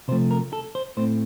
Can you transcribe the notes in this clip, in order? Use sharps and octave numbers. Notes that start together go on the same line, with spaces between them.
C3 F3 A3 C5
A#4
A4
C5
A2 A3 C4 C5